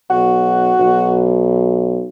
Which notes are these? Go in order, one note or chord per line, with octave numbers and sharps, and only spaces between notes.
B1 F#4
B1